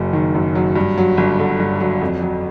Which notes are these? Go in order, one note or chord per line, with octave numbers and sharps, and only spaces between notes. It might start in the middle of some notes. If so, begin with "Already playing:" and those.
Already playing: F#1 F#2 F#3
D#3
F#2
F#3
G2
F#3
G1
D3
G2
F#3
F2
F#3